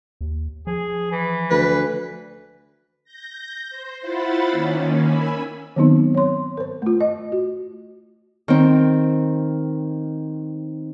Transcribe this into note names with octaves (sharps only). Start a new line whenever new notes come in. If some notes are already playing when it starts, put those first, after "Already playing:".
D#2
F3 G#4
E3
D2 B4
G6 A#6
C5
E4 F4 C5 F#5 B5 A6
D#3 A#3 C#4
G#5 B5 E6
D#3 F#3 B3 C4 D#4
C#5 C6
A#4 C5
A3 F4
D#5
F#4
D#3 C4